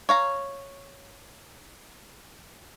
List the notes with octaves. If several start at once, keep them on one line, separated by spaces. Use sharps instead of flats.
C#5 F5 A#5